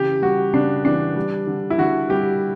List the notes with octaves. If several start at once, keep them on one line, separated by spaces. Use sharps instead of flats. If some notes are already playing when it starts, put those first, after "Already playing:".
Already playing: C#3 E3 G4
G3 F#4
C#3 D4
E3 D4
G3
D3
E4
D3 F#4
G3 G4